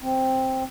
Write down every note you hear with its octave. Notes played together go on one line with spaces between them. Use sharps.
C4